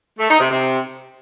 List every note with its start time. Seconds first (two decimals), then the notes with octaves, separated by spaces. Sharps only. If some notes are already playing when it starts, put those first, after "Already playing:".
0.19 A3
0.29 D#4
0.40 C3
0.50 C3